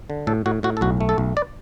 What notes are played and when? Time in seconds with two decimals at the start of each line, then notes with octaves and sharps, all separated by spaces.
0.10 D3
0.27 A2 A4
0.46 A2 F#4
0.63 A2 F#4
0.77 A4
0.81 B1 F#4
1.01 A3
1.09 A4
1.18 B1
1.37 D5